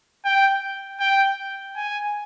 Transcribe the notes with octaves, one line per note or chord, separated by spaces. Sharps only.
G5
G5
G#5